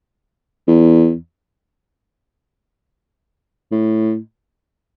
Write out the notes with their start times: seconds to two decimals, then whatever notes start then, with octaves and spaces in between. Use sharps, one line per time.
0.68 E2
3.71 A2